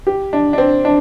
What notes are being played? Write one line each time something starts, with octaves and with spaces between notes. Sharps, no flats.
G4
D4
D4
C4
D4